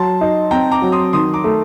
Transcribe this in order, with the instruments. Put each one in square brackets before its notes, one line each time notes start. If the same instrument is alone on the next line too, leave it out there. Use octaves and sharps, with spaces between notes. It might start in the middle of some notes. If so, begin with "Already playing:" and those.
Already playing: [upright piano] F#3 [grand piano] A5 C6
[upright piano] D#4
[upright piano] C4 [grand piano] G5 A#5
[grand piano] A#5 D6
[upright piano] F#3
[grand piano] C6 D#6
[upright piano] D#3 [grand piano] C6 D#6
[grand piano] A#5 D6
[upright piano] A3